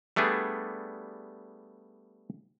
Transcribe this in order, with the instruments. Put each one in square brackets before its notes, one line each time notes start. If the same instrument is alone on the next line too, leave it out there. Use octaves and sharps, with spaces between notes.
[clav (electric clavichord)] G3 A3 B3 D4 G#4